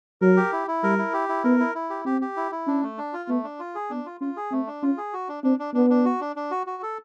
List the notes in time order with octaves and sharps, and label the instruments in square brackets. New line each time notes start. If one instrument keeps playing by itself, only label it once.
[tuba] F#3 [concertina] A#4
[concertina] G4
E4
E4
[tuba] G3 [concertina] A#4
[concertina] E4
G4
E4
[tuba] B3 [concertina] A#4
[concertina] E4
E4
G4
[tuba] C4 [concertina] G4
[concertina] G4
E4
E4
[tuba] C#4 [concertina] D4
[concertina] A3
D4
F4
[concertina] A3 [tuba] B3
[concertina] D4
F4
G#4
[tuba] B3 [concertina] D4
[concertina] F4
[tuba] C#4 [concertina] F4
[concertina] G#4
[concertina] A3 [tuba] C4
[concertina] D4
[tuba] C#4 [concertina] F4
[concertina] G#4
F#4
D4
[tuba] C4 [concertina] D4
[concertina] D4
[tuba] B3 [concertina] D4
[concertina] D4
F#4
D4
D4
F#4
F#4
A4